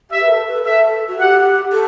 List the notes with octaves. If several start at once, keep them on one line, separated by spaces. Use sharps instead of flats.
G4 E5
B4
A4
B4
A4 E5
F#4
G4 F#5
A4